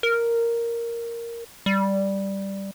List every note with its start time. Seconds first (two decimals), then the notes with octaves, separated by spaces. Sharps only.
0.03 A#4
1.66 G3